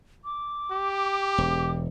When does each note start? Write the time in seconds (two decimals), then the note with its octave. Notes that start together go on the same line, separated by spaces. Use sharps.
0.25 D6
0.71 G4
1.38 E1